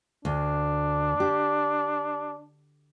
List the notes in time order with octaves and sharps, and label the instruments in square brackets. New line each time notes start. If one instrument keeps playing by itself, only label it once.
[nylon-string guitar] D2 [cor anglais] D4
[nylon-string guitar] G4